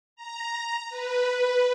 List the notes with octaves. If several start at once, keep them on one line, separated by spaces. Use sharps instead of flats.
A#5
B4